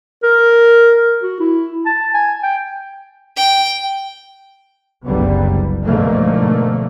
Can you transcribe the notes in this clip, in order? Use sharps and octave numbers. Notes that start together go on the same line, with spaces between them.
A#4
F#4
E4
A5
G#5
G5
G5
F#1 C2 D3 G3 B3
G#2 B2 D3 F3 A3 A#3